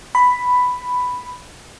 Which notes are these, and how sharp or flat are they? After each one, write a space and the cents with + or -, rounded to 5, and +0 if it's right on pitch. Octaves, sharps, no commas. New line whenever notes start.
B5 +5